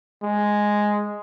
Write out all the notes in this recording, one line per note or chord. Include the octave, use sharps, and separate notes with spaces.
G#3